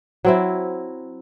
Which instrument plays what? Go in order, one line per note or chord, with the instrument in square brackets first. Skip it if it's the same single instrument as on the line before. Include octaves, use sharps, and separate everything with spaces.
[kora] F#3 C4 E4